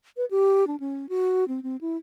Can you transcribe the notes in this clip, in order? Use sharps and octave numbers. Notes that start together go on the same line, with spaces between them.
B4
G4
D4
C#4
F#4
C4
C4
E4